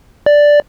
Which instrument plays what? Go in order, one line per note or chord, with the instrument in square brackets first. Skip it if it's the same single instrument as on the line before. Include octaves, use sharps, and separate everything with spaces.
[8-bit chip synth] D5